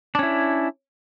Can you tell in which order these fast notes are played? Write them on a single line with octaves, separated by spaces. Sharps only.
D4 C#4 E4